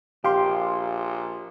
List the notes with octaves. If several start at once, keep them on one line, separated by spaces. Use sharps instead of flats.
A#1 G4 F5 C6